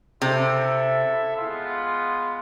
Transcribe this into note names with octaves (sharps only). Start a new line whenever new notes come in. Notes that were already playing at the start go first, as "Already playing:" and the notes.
C3 E4 A4 E5
G#3 B3 F4